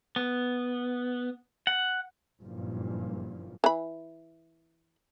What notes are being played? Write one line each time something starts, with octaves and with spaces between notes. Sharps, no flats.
B3
F#5
F#1 G2 A#2 F3
E3 B5